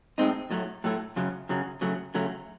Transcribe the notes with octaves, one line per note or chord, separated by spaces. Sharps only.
A2 G#3 C4 D#4
A2 F#3 A3
A2 F#3 A3
F#2 C#3 F#3
F#2 C#3 F#3
C#3 F#3 A3
C#3 F#3 A3